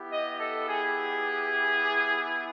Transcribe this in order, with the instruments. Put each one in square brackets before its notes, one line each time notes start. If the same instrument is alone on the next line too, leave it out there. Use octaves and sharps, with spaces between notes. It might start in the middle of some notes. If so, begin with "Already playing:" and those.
Already playing: [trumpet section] B3 E4 G4
D#5
A4
G#4